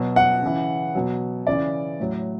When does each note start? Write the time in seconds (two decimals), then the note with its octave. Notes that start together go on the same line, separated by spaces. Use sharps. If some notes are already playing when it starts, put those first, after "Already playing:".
Already playing: B2 F#3
0.16 F#5
0.42 C#3 E3
0.95 B2 F#3
1.47 C#3 E3 D5
2.00 A2 F#3